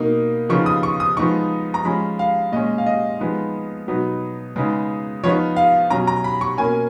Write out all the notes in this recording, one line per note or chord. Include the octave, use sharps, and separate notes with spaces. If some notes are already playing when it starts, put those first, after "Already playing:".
Already playing: B2 A#3 D#4
C#3 F3 B3 D#4 C#6
D#6
C#6
D#6
F3 G#3 B3 D#4 C#6
A#5
F3 G#3 C#4 B5
F5
A#2 G#3 C#4 D#5
F5
D#5
F3 G#3 B3 D#4
B2 F#3 B3 D#4
C#3 G#3 B3 D#4
F3 B3 D#4 C#5
F5
B2 F#3 C#4 A#5
A#5
B5
C#6
B2 A#3 C#4 G#5